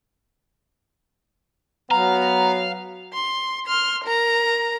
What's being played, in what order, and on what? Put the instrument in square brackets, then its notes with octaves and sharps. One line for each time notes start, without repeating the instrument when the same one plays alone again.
[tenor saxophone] F#3 [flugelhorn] B3 [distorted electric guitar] F5 [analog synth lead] A#5
[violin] C6
C6 F6
A#4 A#5